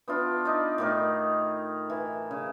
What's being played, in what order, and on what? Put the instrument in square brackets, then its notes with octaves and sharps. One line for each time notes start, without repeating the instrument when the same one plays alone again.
[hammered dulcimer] B3 D4 E4 F4
D#4 D5
A2 D#3 A#4
E3
C#3